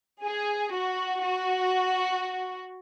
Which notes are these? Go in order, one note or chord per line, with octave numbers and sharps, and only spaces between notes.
G#4
F#4
F#4